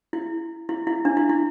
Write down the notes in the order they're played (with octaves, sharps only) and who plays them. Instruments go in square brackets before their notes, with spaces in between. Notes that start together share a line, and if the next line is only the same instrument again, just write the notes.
[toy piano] E4
E4
E4
D4
E4
E4